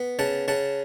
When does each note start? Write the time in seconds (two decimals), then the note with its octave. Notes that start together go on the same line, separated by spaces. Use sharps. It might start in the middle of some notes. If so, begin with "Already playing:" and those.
Already playing: B3
0.19 C#3 F#5 A5
0.48 C#3 F#5 A5